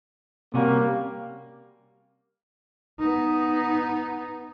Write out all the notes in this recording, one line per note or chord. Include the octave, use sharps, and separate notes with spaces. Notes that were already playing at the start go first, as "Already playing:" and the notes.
C3 G3 A#3 C#4 F#4
B3 D#4